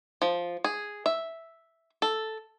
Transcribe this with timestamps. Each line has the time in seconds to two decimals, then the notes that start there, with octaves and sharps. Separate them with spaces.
0.22 F3
0.64 G#4
1.06 E5
2.02 A4